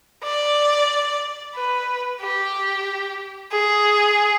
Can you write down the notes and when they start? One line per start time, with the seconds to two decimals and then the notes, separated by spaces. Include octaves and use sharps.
0.24 D5
1.55 B4
2.21 G4
3.52 G#4